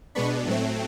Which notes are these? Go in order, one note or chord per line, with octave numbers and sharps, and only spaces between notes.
B2 G#3 B3 D4 B5 C#6
A2 F#3 A3 C4